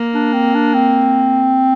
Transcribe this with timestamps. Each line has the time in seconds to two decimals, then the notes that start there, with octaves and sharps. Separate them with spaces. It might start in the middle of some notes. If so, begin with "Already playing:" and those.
Already playing: A#3
0.14 D4
0.34 C4
0.55 D4
0.75 C4